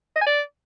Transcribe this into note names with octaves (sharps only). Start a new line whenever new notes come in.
D#5
G#5
D5